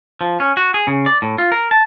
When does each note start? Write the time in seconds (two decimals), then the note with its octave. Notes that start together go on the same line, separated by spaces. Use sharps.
0.21 F3
0.40 C#4
0.57 F#4
0.74 G#4
0.87 C#3
1.06 D5
1.22 A2
1.38 F4
1.52 A#4
1.71 A5